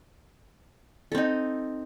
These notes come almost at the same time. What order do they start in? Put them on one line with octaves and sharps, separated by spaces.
A4 C4 D#4